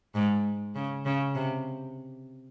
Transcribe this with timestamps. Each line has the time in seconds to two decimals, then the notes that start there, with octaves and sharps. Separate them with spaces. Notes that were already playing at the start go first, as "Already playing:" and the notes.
0.15 G#2
0.75 C#3
1.05 C#3
1.35 C3